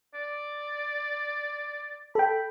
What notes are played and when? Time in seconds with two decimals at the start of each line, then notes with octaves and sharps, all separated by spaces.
0.14 D5
2.15 A4 G5 B5